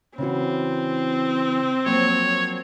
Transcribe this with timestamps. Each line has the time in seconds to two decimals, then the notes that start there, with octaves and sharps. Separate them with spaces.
0.18 C#3 E3 C4 F#4
1.86 F3 F#3 A#3 C#5